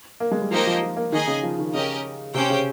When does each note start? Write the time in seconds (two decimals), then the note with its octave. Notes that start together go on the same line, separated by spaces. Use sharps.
0.20 A#3
0.32 G#3
0.41 G3
0.51 F3 A#3 D#4 G4 C5 D#5
0.67 F3
0.83 F3
0.97 A#3
1.12 D#3 D#4 G#4 D#5 G#5
1.27 C#3
1.43 F3
1.59 D#3
1.73 C#3 C#4 G4 A#4 D#5
2.34 C3 C#4 G4 C5 G5
2.50 C#3